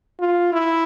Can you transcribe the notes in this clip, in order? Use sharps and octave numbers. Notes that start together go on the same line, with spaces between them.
F4
E4